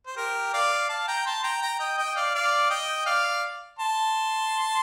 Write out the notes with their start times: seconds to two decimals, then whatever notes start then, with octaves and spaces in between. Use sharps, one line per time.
0.07 C5
0.17 G4 A#4
0.54 D5 F5
0.89 F5 A5
1.07 G5 A#5
1.26 A5 C6
1.43 G5 A#5
1.62 G5 A#5
1.80 D#5 G5
1.98 D#5 G5
2.16 D5 F5
2.35 D5 F5
2.70 D#5 G5
3.06 D5 F5
3.79 A5 C6